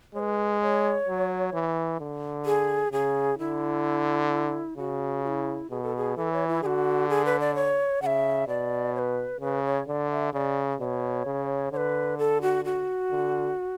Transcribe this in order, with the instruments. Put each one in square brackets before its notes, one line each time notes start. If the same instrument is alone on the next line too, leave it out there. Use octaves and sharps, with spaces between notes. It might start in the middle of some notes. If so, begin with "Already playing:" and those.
[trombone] G#3 [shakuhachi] B4 C#5
[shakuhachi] C#5
[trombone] F#3
E3
D3
[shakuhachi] G#4
[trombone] C#3 [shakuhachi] G#4
[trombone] D3 [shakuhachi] E4
[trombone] C#3 [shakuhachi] F#4
[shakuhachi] F#4
E4
[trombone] B2 [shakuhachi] G#4
[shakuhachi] A4
G#4
[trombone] E3 [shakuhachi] A4
[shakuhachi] C#5
E4
[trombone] D3 [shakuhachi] F#4 G#4
[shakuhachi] G#4
B4
D5
C#5
[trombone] C#3 [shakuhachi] E5 F#5
[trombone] B2 [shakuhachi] D5
[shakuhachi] C#5
B4
[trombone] C#3 [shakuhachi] B4
[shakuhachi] C#5
[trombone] D3 [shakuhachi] D5
[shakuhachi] E5
[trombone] C#3 [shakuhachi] D5
[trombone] B2 [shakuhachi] C#5 D5
[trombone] C#3
[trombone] D3 [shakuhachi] C#5
[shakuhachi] B4
A4
F#4
F#4
[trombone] D3